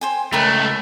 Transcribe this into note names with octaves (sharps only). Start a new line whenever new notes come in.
C5 G5 G#5
C#2 A3 A#4 G5 B5